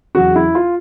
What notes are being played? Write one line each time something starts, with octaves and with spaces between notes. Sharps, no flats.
E2 C#3 F#3 F#4
E4
F4